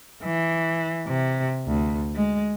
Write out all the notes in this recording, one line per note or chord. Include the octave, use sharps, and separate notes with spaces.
E3
C3
D2
G#3